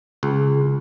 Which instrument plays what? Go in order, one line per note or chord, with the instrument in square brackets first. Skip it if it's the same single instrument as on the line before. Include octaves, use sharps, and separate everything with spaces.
[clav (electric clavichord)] C#2 [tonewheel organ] C#3 G#4